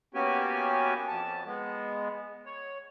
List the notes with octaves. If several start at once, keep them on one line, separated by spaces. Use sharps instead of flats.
A#3 B3 C#4 F#4 G4 G#5
F2 A5
G#3 B3
C#5